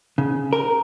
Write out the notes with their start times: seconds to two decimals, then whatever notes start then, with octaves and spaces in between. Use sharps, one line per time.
0.18 C#3
0.53 A#4